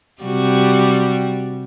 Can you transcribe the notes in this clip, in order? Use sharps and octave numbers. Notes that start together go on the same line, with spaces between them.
C3 G3 F#4